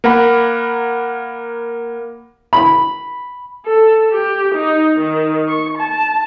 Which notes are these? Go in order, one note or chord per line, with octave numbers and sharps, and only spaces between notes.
A#3 A#4 F#5 B5
B5
A4
G4
D#4
D#3
C#6
A5